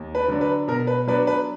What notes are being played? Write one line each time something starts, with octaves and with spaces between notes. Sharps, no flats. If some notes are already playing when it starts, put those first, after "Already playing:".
Already playing: D#2
B4
D3 F#3 D4
B4
B2 A#4
B4
F#3 B3 D4 B4
B4